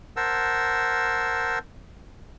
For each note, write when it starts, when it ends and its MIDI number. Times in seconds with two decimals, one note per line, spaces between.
0.17 1.59 70
0.17 1.59 72
0.17 1.59 78
0.17 1.59 81
0.17 1.59 88